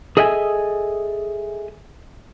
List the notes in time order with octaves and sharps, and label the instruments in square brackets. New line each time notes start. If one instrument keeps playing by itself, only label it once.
[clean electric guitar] G#4 A4 D#5 E5 F#5 G#5